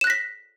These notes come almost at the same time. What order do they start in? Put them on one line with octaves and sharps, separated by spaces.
E7 F#6 A#6 B6